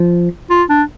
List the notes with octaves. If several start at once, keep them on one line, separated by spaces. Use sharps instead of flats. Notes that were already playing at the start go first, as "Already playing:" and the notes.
Already playing: F3
F4
D4